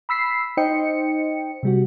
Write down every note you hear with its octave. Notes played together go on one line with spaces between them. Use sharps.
B5 E6 B6 C7
D#4 C5 D#5 G5 C#7
C3 G3 F#4